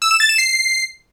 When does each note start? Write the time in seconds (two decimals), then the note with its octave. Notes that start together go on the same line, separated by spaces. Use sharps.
0.02 E6
0.11 E7
0.20 A6
0.29 E7
0.38 C7